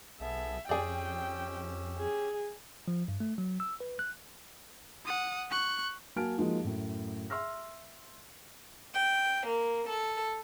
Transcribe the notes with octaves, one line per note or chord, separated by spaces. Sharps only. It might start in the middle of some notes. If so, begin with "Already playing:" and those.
B1 B3 G#4 A4 E5
F2 C#4 G4 G#4 D5 G5 E6
G#4
F3
G2
A3
F#3
E6
B4
F#6
F#5 D#6
C#6 F#6
F#3 A#3 G#5 A5 F6 D7
F3 G#3 A#3 D#4 F4 F#4
F#2 A2
E5 C6 E6 F6 A#6
G5
A#3
A4